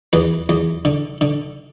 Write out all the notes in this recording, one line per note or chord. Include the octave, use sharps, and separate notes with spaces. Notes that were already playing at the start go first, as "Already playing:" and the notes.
E2 B4
E2
D3
D3